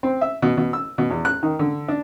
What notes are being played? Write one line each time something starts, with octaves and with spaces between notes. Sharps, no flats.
C4
E5
B2
B2
E6
B2
E2
F#6
D#3
D3
D4